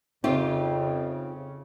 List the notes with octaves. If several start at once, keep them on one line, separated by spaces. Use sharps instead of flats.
F2 C#3 C4 D#4 F4 G4 E5